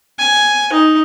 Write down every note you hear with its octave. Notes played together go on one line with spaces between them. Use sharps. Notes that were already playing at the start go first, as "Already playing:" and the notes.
G#5
D#4